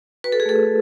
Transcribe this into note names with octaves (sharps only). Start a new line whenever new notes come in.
F#4 B4
A4
G#4
A3 A4